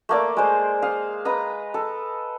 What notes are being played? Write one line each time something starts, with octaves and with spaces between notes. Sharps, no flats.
A3 A#3 D5
G#3 C5
F5 D#6
B4 D#5 A#5
A4